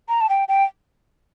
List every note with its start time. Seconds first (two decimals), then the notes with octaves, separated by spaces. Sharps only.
0.09 A#5
0.21 A5
0.29 G5
0.48 G5